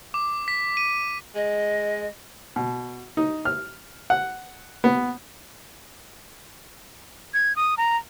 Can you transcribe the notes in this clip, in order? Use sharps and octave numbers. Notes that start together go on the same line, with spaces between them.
D6
B6
D#7
G#3 D#5
B2
D#4
F6
F#5
B3
G#6
D#6
A#5